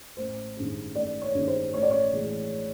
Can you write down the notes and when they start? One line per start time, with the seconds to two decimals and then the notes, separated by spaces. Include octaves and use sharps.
0.17 A1 C5
0.56 G2 D#3 G#3 C#4
0.95 A1 D5
1.22 C#5
1.35 G2 D#3 G#3 C#4
1.48 C5
1.74 A1 C#5
1.82 D5
1.91 C#5
2.12 A2 E3 G#3